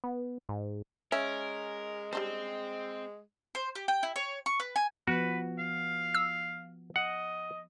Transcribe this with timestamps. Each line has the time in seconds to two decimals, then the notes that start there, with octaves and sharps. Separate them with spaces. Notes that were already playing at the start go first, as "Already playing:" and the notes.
0.04 B3
0.49 G#2
1.12 G#3 C#4 A#4 E5
2.13 G3 C4 D4 C5
3.55 C5
3.75 G4
3.88 G5
4.03 E4
4.16 C#5
4.46 C#6
4.60 B4
4.76 G#5
5.08 F3 B3 F#4 B4
5.59 F5
6.14 E6
6.96 D#5 F#5